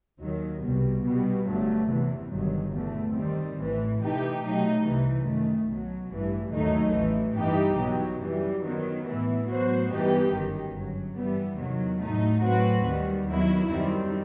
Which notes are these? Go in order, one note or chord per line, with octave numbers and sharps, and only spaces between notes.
D#2 D#3 F#3
C2 B2 G3
B2 G3 B3
G1 G2 F#3 A3
E2 C3 E3
G1 G2 D#3 F#3
E2 B2 A3
D#3 G3 C4
A1 A2 E3
C3 E3 A3 D#4 G4
B2 F#3 A3 D#4
C2 C3 E3
F#2 D#3 A3
B1 B2 F#3
A1 G2 E3
D#2 D#3 F#3 A3 D#4
A1 A2 E3
G2 E3 B3 D#4 G4
B1 B2 F#3
F#2 E3 G3
D#3 F#3 B3
A2 E3 B3 E4
A2 F#3 B3 F#4 C5
G2 E3 B3 D#4 G4
G1 F#2 D#3
G1 F#2 F#3
G2 E3 G3 B3
E2 C3 D#3 F#3
A2 F#3 A3 D#4
A2 F#3 C4 F#4 B4
D#2 D#3 G3
D#2 D#3 F#3 B3 E4
F#2 D#3 G3 C4